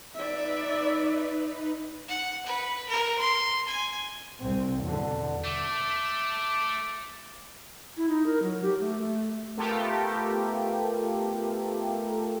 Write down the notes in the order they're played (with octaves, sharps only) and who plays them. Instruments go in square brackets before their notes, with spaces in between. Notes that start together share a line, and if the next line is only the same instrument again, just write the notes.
[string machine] D#4 B4 [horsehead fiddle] D5 E5
[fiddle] F#5
B4
A#4
C6
G#5
[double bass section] C2 C4
E2 B2 D3
[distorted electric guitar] A3 [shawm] D6
[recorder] E4
D#4
A#4
F#3
G4
A3
A3
[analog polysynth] A3 B3 F4 G4 A4 A#4